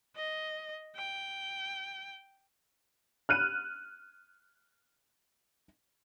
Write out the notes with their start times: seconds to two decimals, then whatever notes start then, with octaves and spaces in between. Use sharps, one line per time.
0.16 D#5
0.96 G5
3.29 F6 F#6 D#7